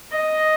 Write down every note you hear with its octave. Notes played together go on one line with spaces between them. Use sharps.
D#5